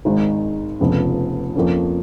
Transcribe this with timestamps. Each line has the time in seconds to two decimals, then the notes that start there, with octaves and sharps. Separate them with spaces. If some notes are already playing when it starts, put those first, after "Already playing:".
0.05 G#1 G#2 D#3 G#3 D#4
0.80 F1 F2 C#3 F3 B3
1.55 F2 F3 A#3 C#4